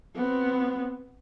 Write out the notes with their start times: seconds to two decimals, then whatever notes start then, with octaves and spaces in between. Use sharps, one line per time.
0.16 B3 C4